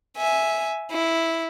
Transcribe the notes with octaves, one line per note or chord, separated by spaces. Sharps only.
E5 G#5
E4